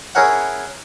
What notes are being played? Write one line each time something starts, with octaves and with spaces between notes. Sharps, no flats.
C#4 E4 G#4 A#4 C#5 F#5